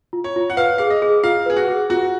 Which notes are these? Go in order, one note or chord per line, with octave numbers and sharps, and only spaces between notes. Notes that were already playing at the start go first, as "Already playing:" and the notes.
F4
C#5
F4
F#5
B4 F5
G#4 F5
D#5
G#4
F4 F5
G#4 B4
F#4
G#4
F4 F#4